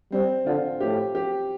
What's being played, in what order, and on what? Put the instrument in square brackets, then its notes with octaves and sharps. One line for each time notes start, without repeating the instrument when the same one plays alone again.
[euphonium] G3 [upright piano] C4
[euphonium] D3 [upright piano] F4
[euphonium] A2 [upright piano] G4
[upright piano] G4